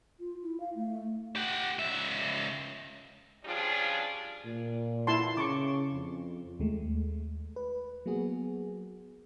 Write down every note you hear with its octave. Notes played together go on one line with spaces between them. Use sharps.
F4
E4
F5
A3
G4 F#5
C#2 E5
F3 G3 C#4 D4 F4 G#4
A#2
E4 A5 C6
C#3 C#6 D6
F2
D#2 G#3 A3
B4
F#3 A#3 B3 F#4 G#4